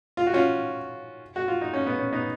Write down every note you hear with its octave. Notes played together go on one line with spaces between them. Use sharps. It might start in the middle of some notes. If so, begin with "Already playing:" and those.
F4
F#4
C#4 F4
F#4
F4
D#4
C#4
B3
C#4
B3 D#4